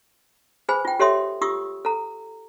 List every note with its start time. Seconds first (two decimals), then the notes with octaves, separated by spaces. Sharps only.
0.69 G#4 B4 C5 G#5 B5
0.85 F4 G5
0.99 G4 A4 C#5 E5 C6 D#6
1.41 F4 G4 C#6 D#6 E6
1.85 A4 A#5